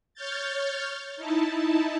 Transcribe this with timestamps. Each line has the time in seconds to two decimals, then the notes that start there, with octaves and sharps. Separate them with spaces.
0.14 C#5 F6 G6 A6
1.17 D#4 E4 A5